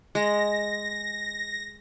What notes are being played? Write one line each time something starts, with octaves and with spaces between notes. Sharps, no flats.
G#3 A#6